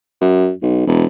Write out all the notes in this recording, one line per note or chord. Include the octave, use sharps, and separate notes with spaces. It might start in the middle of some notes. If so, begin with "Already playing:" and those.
F#2
B1
E1